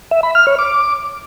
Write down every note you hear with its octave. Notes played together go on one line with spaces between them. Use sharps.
E5
B5
F6
C#5
D6